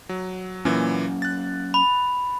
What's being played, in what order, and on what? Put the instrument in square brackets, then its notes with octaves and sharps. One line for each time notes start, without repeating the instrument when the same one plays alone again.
[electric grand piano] F#3
[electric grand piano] A#2 E3 [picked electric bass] F#3 A#3 C#4
[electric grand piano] F#6 A6
[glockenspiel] B5